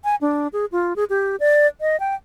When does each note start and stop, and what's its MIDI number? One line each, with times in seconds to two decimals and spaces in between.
0.04 0.16 80
0.21 0.48 62
0.53 0.65 68
0.72 0.93 65
0.96 1.04 68
1.10 1.36 67
1.40 1.67 74
1.81 1.99 75
2.00 2.15 79